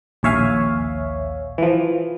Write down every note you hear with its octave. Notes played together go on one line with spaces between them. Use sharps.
A#1 D#2 C#5 E5 F5 G#5
E3 F3